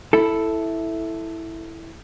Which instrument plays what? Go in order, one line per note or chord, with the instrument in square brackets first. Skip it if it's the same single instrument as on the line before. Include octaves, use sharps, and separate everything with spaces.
[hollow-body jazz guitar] E4 A4